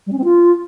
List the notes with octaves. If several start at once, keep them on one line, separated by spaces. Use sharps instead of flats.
G3
C#4
C4
F4